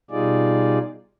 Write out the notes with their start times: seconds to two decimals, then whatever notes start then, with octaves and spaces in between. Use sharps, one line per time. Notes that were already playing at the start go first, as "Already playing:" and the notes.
0.11 B2 G3 D#4 F4 G#4 D5